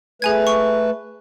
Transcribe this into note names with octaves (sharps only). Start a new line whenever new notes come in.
A3 G#4 B4 G#5 G#6
C#6